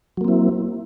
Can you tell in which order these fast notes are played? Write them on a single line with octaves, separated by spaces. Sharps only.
F#3 A#3 C4 E4